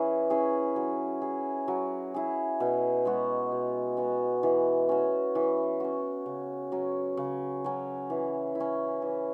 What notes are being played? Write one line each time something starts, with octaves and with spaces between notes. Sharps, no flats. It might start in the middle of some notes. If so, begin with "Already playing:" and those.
Already playing: E3 C#4 E4 G#4
C#4 E4 G#4
F#3
E4 G#4
F#3
E4 G#4
B2
G#3 B3 F#4
B2
G#3 B3 F#4
E3
C#4 F#4
E3
C#4 F#4
C#3
F#3 C#4
C#3
F#3 C#4
E3
E4
C#4
E3